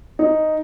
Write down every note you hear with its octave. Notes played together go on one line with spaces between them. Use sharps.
D#4